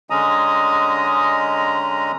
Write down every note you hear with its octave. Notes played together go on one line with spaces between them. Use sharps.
D3 G#3 C#4 D#5 A#5 D#6